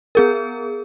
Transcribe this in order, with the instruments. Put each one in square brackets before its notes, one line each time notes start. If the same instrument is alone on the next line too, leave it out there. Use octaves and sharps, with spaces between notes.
[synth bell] B3 G#4 A#4